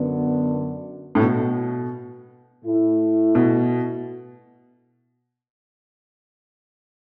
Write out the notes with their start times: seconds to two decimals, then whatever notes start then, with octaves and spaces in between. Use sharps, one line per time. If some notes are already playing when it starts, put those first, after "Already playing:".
Already playing: F#2 D3 B3
1.15 A2
1.20 B2
2.64 A2 A3 E4
3.35 B2